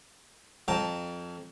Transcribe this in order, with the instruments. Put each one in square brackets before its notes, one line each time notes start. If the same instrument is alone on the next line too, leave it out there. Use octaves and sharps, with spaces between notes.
[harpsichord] F2 G5 A5 A#5